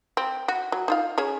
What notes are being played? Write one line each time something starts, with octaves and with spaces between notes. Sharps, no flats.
C4
F#4
F#3
D#4 F4 F5
C#4 G#4 C#5